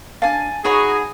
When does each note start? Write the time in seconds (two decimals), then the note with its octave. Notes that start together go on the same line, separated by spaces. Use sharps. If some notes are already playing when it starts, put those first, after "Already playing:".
0.22 D4 F5 G#5 A5
0.65 D#4 F#4 G#4 C#5 A#5 B5 D#6